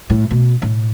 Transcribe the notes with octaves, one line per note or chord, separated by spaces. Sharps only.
A2
B2
A2